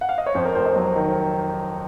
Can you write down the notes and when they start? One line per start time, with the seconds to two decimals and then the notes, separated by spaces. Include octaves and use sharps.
0.01 F#5
0.09 F5
0.18 D#5
0.26 C#5
0.35 F2 C5
0.45 A#4
0.55 F1 C5
0.66 D#5
0.76 F#3
0.96 D#3